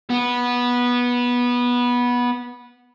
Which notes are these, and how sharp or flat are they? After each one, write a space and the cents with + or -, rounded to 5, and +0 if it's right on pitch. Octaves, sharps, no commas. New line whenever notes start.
B3 -15